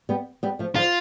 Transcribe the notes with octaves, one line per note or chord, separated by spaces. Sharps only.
G3 B3
G3 B3
F3 A3
D3 F3 F4